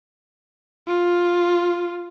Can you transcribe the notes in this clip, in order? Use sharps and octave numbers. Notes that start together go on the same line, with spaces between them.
F4